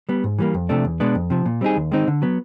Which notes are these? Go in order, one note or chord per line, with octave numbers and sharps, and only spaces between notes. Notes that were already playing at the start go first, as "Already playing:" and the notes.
G3 B3
G#2
E3 G3 A#3
F2
C3 F3 A3 D4
E2
B2 G#3 B3 D4
F2
C3 F3
A#2
G3 C4 D#4 G#4
D#2
D#3 G#3 C4 D#4
D3
F#3 B3